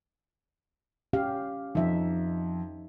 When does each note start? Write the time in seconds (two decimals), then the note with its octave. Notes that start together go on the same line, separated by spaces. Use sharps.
1.13 C#4 G4 F5
1.75 F2 D#4 E5